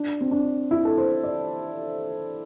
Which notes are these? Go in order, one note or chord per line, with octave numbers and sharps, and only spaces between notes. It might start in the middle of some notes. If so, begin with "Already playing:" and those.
Already playing: D4
C4
D4
E4
A4
C5
D5